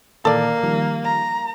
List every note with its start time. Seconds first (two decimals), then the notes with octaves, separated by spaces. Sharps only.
0.25 A#2 D#3 E3 A#3 A4 D5
0.63 D#3 F3 G3
1.04 A#5